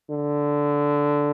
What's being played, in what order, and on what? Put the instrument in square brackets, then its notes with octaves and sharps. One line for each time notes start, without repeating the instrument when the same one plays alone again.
[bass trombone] D3